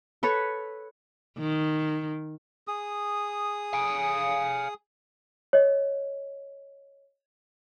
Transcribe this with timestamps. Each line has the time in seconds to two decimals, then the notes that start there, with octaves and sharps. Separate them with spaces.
0.23 A4 B4 C#5
1.38 D#3
2.68 G#4 D#6
3.73 F5 G#5
5.53 C#5 D#5